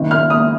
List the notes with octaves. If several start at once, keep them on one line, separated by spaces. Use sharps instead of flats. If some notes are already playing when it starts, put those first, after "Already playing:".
Already playing: F#1 F#2 D#3
F6
D#6